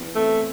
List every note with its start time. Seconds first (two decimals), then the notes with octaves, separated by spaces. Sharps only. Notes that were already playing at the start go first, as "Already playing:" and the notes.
Already playing: E2
0.15 A3 C4